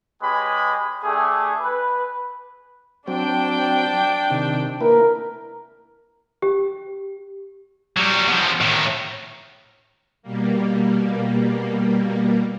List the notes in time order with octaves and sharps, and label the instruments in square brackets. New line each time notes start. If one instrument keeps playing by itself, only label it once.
[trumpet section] G#3 C#4 G4 B4 G#5 B5
A3 D4 G4 G#4
B4
[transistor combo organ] F#3 C4 [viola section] D4 G5
[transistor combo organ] C3 D#3
[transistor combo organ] A#3 E4 B4 [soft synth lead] A#4
[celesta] G4
[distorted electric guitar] F#3 G3
B2 F3
A2 D#3
[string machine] B2 G3 A#3